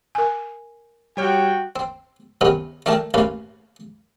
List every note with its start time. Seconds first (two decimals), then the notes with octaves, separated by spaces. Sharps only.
0.15 A#4 G#5
1.17 G3 F#4 C#5 G5 F6
1.76 C4
2.41 C3 D#3 B3 C#4
2.86 A3 D4 A#4 G5 A5
3.14 A1 A#3 C#4 B4